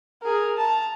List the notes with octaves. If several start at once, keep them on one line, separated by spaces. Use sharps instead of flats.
G#4 A#4
A5 A#5